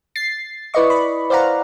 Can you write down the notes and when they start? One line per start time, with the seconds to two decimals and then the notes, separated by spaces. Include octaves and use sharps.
0.15 A6 C7
0.74 E4 B4 D5 D#5 C#6
0.90 B5
1.30 C5 D5 F5 F#5 A#5